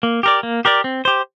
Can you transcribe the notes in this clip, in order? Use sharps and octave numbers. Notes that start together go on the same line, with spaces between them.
A#3
G4 A#4 D5
A#3
G4 A#4 D5
C4
G4 C5